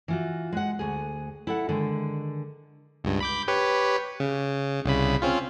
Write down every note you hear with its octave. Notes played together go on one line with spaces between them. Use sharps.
E3 F4 F#4
G#3 F#5
D2 G#4
E4 A4 F#5
D3 D#3 G#3
C#2 G2
B5 D6 G6
G4 B4 C#5
C#3
C2 C#3 B5
C4 C#4 F4